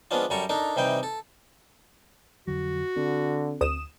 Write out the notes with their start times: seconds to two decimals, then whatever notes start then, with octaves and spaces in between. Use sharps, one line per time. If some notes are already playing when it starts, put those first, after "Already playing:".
0.11 F3 G#3 B3 C#4 D4 F4
0.30 F#2 G3 A4 A#5 C#6
0.49 D4 D#4 A4 A#4
0.76 C3 E3 G3 D#4 G5
1.03 A4
2.47 F2 D3 F#3 F#4
2.96 D3 C4
3.61 D2 D#6 E7